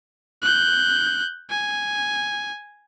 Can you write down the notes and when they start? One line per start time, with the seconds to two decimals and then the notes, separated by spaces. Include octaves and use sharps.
0.43 F#6 G6
1.50 G#5